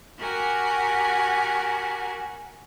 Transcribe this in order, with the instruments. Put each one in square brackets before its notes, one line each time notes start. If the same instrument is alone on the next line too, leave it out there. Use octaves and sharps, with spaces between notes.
[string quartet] F#4 G4 A#4 F#5 G#5